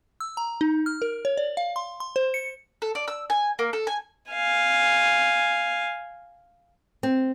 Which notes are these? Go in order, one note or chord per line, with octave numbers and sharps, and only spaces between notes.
E6
A#5
D#4
F6
A#4
C#5
D5
F5
C6
C6
C5
C#7
A4
D5
E6
G#5
A#3
A4
G#5
F5 G#5
C4